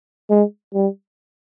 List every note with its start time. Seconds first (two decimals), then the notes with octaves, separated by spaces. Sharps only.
0.30 G#3
0.74 G3